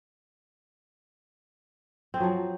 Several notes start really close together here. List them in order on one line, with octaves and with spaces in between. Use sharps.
C4 G#4 F#3 F3